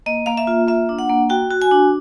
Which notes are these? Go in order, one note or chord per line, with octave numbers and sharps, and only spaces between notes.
A#3 D#5
A#3 F5
E5
F4
A#3 E5
D4
F#5
A#3
F#4 G5
F#4
G#5
D4